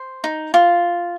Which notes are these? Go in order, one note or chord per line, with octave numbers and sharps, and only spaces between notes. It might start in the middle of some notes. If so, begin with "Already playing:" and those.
Already playing: C5
D#4
F4